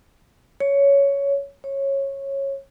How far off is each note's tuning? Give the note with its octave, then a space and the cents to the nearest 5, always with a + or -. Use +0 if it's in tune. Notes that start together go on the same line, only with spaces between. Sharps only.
C#5 +10
C#5 -15